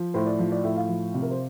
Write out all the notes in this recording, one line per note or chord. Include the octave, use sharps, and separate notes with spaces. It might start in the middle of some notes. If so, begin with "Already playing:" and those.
Already playing: F3
A2 C5
D5
F3
D5
A2 E5
F5
F3
C3
A#4
C5